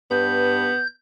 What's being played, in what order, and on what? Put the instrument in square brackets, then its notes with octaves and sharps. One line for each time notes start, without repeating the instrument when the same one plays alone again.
[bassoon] G2 [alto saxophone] B3 [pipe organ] G6